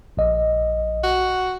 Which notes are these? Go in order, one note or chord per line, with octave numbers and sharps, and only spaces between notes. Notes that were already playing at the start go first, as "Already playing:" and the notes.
A#1 D#5
F#4